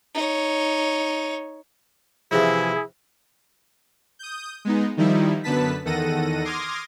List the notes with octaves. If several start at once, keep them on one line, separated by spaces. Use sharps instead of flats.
D#4 C#5
C3 E3 F3 E4 G#4
D#6 G6
G#3 B3 D#4
D#3 F3 G3 D#4 E4
F#2 D3 B3 B4 A5 B6
E2 D#3 A4 F#5 A#6 D#7
C6 D6 D#6 F6 G#6 A#6